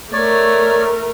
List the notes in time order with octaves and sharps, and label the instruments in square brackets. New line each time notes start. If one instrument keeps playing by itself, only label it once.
[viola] A3 A#4 [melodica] C#5 D5